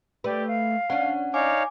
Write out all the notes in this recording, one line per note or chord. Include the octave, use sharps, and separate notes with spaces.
A3 G4 B4 D5
F5
C#4 D4 F#5
D#4 C#5 D5 F5 G#5 D6